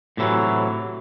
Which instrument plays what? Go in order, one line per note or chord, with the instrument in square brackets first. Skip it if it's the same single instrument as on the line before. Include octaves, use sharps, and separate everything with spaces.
[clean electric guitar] A2 C3 E3 F#3